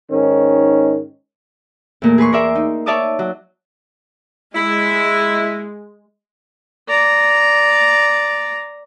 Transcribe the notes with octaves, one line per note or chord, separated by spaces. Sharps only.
G#2 D#3 C#4
E2 A#2 A3
G#4 B4 C6 C#6
A#4 D5 E5
D#4
C#5 D5 E5 A5 D6 D#6
F#3
G#3 E4
D5 A#5